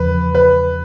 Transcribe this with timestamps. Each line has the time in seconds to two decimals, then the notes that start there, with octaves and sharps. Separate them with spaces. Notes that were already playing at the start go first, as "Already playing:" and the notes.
Already playing: E2 C#3 F3 B4
0.35 B4